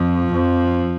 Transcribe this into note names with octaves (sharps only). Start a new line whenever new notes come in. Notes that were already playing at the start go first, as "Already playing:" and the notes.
Already playing: F2 F3
F2